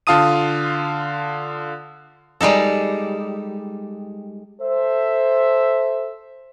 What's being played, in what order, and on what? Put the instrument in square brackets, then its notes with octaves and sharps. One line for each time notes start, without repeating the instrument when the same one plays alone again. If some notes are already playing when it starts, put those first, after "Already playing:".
[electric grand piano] D3 F4 F5 A5 D#6 D#7
[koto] G3 G#3 D#4 A4
[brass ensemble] A4 C5 E5